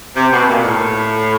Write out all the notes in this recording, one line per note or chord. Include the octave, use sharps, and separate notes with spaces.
C3
B2
A#2
A2